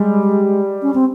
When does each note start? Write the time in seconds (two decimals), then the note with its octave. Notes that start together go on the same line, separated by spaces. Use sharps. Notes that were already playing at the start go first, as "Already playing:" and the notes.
Already playing: G3 G#3
0.82 C#4
0.94 C4